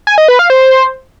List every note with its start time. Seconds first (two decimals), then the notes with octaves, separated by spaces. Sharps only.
0.07 G#5
0.18 D#5
0.28 B4
0.39 F5
0.50 C5